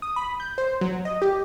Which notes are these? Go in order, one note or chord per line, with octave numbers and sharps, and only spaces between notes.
D#6
B5
G6
C5
F#3
D#5
G4